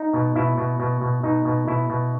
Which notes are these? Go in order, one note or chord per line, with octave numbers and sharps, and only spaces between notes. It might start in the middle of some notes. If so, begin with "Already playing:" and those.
Already playing: D#4
B2
B2 E4
B2
B2
B2
B2 D#4
B2
B2 E4
B2